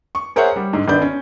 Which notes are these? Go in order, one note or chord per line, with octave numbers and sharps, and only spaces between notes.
C#6
G#4 A#4 C5 C#5 E5 F#5
G3
G#2 D3
G#1 D3 B3 D5 B5 G6
C#4